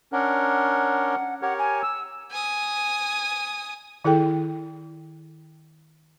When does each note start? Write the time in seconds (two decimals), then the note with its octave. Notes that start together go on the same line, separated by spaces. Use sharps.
0.12 C#4 D4 A#4 F#5
1.42 G4 A#4 C#5 F#5
1.59 G#5
1.82 E6
2.31 G#5 D#6
4.05 D#3 E4 G#4 A4 G5